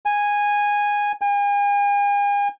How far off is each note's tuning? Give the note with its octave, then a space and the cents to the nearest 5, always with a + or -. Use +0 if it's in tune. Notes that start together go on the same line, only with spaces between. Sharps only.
G#5 -10
G#5 -40